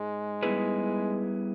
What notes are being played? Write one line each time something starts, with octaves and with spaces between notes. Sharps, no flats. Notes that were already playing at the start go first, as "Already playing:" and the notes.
Already playing: G#2 G#3
G3 B3 E4 G#4 B4